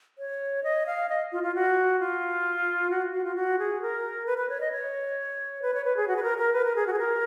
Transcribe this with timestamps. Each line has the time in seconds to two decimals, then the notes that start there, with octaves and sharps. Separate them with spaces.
0.18 C#5
0.64 D#5
0.86 F5
1.09 D#5
1.32 F4
1.43 F4
1.55 F#4
2.00 F4
2.90 F#4
3.13 F#4
3.24 F4
3.36 F#4
3.59 G#4
3.82 A#4
4.26 B4
4.38 B4
4.49 C#5
4.61 D#5
4.72 C#5
5.62 B4
5.74 C#5
5.84 B4
5.97 G#4
6.08 F#4
6.16 B4
6.23 A#4
6.38 A#4
6.53 B4
6.65 A#4
6.76 G#4
6.87 F#4
6.93 G#4
6.99 A#4